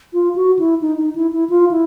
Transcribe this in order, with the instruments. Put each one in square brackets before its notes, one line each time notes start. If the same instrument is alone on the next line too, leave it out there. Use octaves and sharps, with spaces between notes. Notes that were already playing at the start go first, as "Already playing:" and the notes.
[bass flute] F4
F#4
E4
D#4
D#4
E4
E4
F4
E4